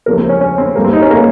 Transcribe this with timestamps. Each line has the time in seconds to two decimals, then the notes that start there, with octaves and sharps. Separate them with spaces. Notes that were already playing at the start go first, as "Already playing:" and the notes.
0.06 C#2 C3 F3 A#3 A#4
0.18 C4
0.29 C#4
0.41 C#4
0.58 C4
0.76 G2 G3 A#3
0.84 C4
0.93 D#4
1.02 C#4
1.11 A#3